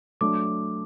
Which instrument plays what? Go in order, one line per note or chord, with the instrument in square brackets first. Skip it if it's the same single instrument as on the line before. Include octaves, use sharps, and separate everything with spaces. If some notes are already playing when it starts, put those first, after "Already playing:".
[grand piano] F#3 A3 D4 [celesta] D6